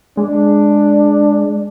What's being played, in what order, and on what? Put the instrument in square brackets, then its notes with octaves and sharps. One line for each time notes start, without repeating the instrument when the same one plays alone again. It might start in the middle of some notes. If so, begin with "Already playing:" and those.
[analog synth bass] G#3 [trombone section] D4